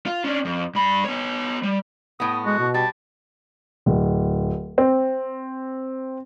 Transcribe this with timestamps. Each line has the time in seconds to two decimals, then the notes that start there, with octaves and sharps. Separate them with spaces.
0.06 F4
0.24 C#4 D4
0.45 F2
0.75 G2 B5
1.05 B3 C#5
1.63 G3
2.20 A2 B3 D#6
2.45 G#3 F#4
2.59 B2
2.74 G3 A5
3.86 D1
4.78 C4